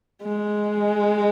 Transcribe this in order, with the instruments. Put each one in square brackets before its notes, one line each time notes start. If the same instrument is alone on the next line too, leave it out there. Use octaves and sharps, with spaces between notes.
[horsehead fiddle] G#3